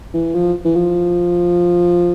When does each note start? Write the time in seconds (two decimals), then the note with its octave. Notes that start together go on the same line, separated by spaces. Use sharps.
0.14 E3
0.34 F3
0.65 E3
0.76 F3